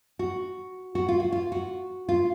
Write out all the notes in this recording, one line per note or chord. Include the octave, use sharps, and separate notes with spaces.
F#4
F#4
F4
F#4
F4
F#4
F4